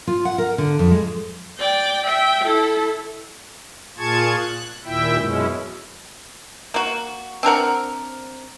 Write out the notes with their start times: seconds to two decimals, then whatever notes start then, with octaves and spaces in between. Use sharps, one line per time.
0.07 F4
0.25 F#5
0.38 A#4
0.58 D3
0.79 F2
0.91 G#3
1.58 D5 G5
2.06 E5 G5
2.44 E4 A4
3.98 A#2 F4 G#4 A5 C#6 G#6
4.39 F#6
4.85 D#2 A#2 E4 E5 G5
5.18 F#2 B2 G#3 C#4 E4
6.74 A#3 F#4
7.43 C4 D4 A#4 F#5